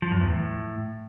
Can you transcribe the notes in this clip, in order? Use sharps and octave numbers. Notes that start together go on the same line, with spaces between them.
F3
F#2
E2
A2